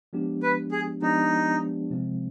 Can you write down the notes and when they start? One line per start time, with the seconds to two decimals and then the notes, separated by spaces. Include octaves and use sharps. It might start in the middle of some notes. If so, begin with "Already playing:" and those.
0.13 F3 G#3 B3 D4 G4
0.43 B4
0.72 G#4
1.02 F3 G#3 B3 D4 D#4 G4
1.90 C3 F3 G#3 C4